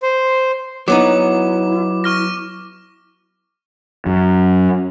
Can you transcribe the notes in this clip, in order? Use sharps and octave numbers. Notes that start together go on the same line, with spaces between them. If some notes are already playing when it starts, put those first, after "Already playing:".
C5
F#3 B3 D#4 E4 D6
C#6 F6 A#6
F#2